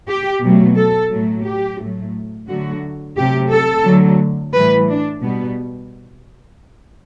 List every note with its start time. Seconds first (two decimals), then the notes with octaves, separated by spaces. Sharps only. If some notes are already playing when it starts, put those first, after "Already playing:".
0.08 G4
0.42 B2 F#3 A3
0.76 A4
1.11 A2 F#3 A3
1.45 G4
1.79 A2 F#3 A3
2.48 D3 F#3 A3 F#4
3.17 C3 F#3 A3 G4
3.51 A4
3.86 D3 F#3 A3
4.54 A2 E3 G3 B4
4.89 D4
5.22 B2 G3 B3